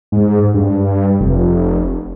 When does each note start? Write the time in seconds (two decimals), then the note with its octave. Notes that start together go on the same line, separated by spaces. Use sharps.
0.12 G#2
0.54 G2
1.20 F1